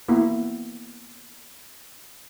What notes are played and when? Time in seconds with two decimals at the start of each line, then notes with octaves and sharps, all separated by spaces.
0.08 A#3 B3 E4